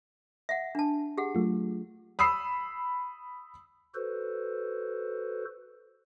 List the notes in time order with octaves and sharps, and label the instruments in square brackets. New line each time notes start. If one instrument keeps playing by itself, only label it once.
[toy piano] E5 F#5
D4 A5
G4 G#4 F#5
[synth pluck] F#3 A3 F4
[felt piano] B5 D#6 E6 C7
[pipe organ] F#4 A4 B4 C5